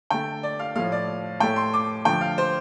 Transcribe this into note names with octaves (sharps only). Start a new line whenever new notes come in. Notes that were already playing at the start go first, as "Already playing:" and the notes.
D3 A3 G5
D5
F5
A2 F3 A3 F5
D5
A2 A3 G5
C6
D6
D3 F3 A3 G5
F5
C5